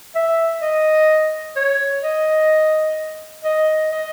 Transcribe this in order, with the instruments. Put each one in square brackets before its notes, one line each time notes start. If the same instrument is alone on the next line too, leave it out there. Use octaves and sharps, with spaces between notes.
[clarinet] E5
D#5
C#5
D#5
D#5
D#5